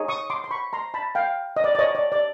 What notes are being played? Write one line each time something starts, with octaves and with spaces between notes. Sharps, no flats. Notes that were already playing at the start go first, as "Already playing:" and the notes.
Already playing: D#4 G#4 C#5
C#6 D#6
C6 D6
C6
B5 C#6
A#5 C6
A5 B5
F5 G5
D#5
D5
D5
C#5 D#5
D5
D5